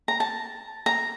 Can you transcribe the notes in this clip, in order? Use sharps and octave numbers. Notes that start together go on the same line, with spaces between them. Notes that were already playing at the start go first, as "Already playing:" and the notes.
A#5
A5
A#5